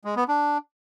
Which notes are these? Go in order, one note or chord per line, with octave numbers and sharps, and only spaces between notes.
G#3
B3
D4